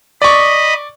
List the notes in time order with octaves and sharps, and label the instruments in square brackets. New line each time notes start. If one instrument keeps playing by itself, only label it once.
[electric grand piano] D5 C#6 [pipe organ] D#5 B5